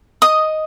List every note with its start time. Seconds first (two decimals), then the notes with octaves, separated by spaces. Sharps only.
0.22 D#5 D#6